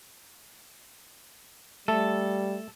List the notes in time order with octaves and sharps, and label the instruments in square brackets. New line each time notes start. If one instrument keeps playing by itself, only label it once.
[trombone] G3 [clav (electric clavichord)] A3 [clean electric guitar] A4